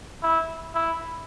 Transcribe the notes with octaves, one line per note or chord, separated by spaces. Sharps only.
E4
E4